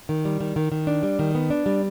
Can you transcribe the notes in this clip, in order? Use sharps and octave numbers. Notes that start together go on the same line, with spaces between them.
D#3
G3
D#3
D#3
D#3
D4
G3
D#3
B3
D4
G3